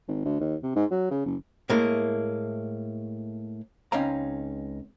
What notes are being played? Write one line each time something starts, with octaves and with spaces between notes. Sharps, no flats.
G#1
D2
D#2
C3
G#2
F#3
C#3
F#1
A2 G#3 A#3 E4
C#2 C4 C#4 D#4 F5 A#5